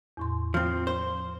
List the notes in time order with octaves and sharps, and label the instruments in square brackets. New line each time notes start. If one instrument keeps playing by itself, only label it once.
[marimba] E2 A2 C6
[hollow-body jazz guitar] F3 C4 [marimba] F6
[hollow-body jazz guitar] C5